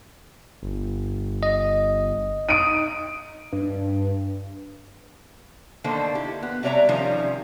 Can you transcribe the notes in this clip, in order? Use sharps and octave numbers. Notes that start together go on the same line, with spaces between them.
G1
D#5
D#4 D#6 D7 D#7
G2
D3 D#3 A#3 A4 C5
E4 G4
B3
C3 G3 C#5 D5 E5 A#5
C3 D#3 F3 G3 C#4